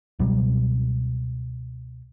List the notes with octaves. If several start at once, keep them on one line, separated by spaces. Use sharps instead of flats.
C#2 B2 F#3 G3